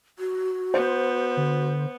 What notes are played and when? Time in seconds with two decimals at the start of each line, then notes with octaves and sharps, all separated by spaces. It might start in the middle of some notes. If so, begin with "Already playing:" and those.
0.19 F#4
0.74 B3 C5
1.37 D3